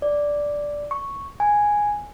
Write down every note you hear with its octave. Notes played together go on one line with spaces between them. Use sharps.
D5
C#6
G#5